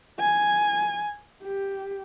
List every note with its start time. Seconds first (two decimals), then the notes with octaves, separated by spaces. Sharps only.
0.20 G#5
1.44 G4